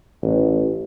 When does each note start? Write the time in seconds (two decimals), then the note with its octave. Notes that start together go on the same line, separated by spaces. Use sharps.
0.22 A1